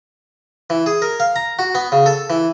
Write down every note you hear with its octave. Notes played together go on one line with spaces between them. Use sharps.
E3
G#4
A#4
F5
A#5
F#4
B3
C#3
A4
E3